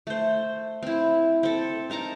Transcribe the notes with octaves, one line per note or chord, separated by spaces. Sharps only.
A3 C5
C4 E4
C4 A4
D#4 A#4 A5 A#5